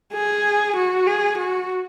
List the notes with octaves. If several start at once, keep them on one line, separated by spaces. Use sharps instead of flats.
G#4
F#4
G#4
F#4